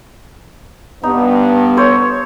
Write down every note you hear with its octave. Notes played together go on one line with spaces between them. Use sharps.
G2 B3 D#4
A4 C5 C#5